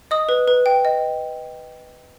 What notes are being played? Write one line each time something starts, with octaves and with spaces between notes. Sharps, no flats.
D#5 D#6
B4
B4
G5
D#5